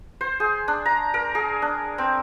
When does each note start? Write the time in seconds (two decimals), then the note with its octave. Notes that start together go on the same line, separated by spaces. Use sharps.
0.21 C5
0.40 G#4
0.68 D4
0.86 A#5
1.14 A#4
1.35 G#4
1.62 D4
1.98 C4